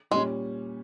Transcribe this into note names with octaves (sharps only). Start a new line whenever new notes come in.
A#2 G3 G#3 C#4